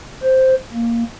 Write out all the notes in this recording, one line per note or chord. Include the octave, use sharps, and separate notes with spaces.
C5
A#3